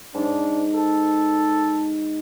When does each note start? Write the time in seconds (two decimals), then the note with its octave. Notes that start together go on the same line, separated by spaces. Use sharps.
0.14 G#2 D4
0.74 A4